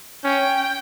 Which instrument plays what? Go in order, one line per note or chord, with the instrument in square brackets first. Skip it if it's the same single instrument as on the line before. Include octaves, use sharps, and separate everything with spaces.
[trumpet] C#4 [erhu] G5